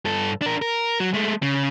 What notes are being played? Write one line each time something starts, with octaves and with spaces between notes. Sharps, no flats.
G2 A4
D4 A#4
A#4
F#3
G#3 A3
C#3